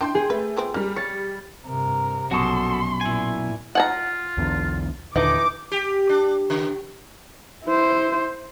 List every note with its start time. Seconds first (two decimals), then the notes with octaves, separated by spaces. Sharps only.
0.01 D4 E4 G5 C6 G6
0.15 G#4
0.30 A3 B4
0.57 F3 B3 C4
0.74 G3 A#3 F6
0.96 C#5 A6 C#7
1.66 G2 C3 A#4
2.31 A#1 F#2 B2 F#4 A4 C6
3.01 A#2 E4 G#5
3.75 F4 F#5 G#5 A#5
4.37 B1 E2 D3
5.16 D#2 A#2 D3 E3 D#4 D6
5.72 G4
6.09 D4
6.50 C#3
7.65 E4 C5